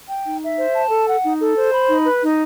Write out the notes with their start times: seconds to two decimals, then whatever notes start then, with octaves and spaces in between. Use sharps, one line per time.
0.08 G5
0.25 D#4
0.42 E5
0.58 C5
0.74 A5
0.91 A4
1.07 F#5
1.24 D#4
1.40 A4
1.56 C5
1.73 B5
1.89 D#4
2.05 B4
2.22 D#4